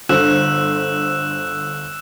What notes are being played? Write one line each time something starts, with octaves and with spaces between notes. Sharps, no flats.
G1 D3 C5 E6 F#6 E7